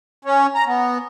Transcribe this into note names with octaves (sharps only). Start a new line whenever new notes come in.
C#4
A#5
B3